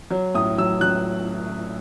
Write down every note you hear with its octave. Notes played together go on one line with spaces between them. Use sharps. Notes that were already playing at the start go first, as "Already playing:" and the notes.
F#3
A2 D#6
F#3 E6
F#3 F#6